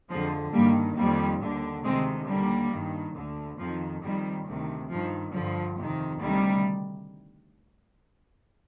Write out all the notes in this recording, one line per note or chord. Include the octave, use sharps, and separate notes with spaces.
F2 D3 F3 G#3
G2 D#3 G3 A#3
F2 D#3 G3 A#3
D#2 D3
D2 C3 D#3 G#3 C4
D#2 D3 G3 A#3
G2 D#3
D2 D3
F2 D#3 F3
F2 D#3 G3
D2 C3 D#3
G2 D#3 F3
G2 D3 F3
F2 C3 D#3
D2 C3 D#3 G3